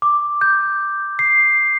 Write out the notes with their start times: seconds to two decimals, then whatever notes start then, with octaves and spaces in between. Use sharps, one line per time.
0.02 D6
0.41 G6
1.19 C7